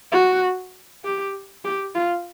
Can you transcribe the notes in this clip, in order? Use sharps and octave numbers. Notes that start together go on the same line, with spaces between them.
F#4
G4
G4
F4